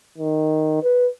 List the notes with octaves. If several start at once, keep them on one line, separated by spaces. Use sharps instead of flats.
D#3
B4